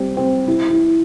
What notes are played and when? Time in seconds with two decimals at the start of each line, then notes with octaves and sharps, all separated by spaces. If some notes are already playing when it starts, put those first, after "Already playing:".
Already playing: G3 C4
0.17 C4
0.48 E4
0.70 E4